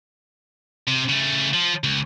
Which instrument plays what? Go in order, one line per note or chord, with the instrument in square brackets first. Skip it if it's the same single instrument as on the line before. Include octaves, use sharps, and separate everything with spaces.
[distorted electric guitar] C3
C#3 A3
F3
C#2